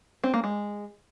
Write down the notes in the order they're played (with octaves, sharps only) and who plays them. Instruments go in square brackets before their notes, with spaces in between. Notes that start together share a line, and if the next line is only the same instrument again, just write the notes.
[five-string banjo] C4
A#3
G#3